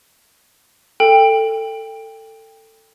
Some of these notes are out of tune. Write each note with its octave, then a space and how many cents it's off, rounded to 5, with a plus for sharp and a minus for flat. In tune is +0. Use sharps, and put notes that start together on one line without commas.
A4 +15 G5 +20